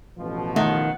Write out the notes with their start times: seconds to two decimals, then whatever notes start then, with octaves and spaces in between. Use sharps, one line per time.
0.19 A1 B2 F3
0.56 D#3 A3 F#5